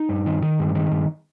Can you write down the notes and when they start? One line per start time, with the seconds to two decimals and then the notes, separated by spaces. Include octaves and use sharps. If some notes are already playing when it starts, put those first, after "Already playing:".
Already playing: D#4
0.09 G2
0.26 D#3
0.43 D#3
0.59 G2
0.75 D#3
0.91 G2